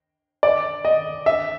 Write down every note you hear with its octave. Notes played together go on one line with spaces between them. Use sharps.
D5
D#5
E5